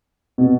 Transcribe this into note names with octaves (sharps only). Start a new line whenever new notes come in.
B2